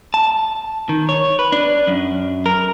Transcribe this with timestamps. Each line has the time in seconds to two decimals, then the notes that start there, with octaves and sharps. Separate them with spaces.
0.14 A5
0.89 D#3
1.09 C#5
1.39 B4
1.52 D4
1.87 F#2
2.46 A#4